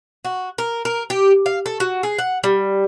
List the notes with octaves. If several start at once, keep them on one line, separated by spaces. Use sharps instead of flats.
F#4
A#4
A#4
G4
F5
A4
F#4
G#4
F#5
G3